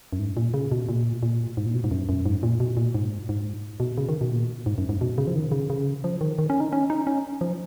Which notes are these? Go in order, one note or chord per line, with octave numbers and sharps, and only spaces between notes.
F#2
G#2
A#2
C#3
B2
A#2
A#2
G#2
A#2
B2
G#2
F#2
F#2
G#2
A#2
B2
A#2
G#2
G#2
B2
C#3
D#3
B2
A#2
G#2
F#2
G#2
B2
C#3
F3
D#3
C#3
C#3
F3
D#3
D#3
C#4
D#4
C#4
D#4
C#4
F3